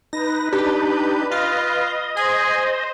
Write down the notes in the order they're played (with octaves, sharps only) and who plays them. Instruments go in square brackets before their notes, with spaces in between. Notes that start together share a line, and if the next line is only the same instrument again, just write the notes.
[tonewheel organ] D#4 [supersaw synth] B4 [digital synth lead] A#6
[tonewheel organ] D4 D#4 [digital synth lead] G4
[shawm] F4 [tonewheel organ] D#5 [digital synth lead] F5
[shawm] G#4 [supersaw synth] C5 [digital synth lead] G#5